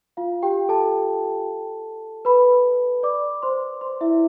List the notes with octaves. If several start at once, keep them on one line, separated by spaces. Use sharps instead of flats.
F4 F5
G4 G5
A4 A5
B4 B5
D5 D6
C5 C6
C5 C6
E4 E5